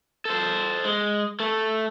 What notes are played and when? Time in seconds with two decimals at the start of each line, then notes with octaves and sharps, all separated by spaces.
0.25 A4 C5
0.85 G#3
1.40 A3 A4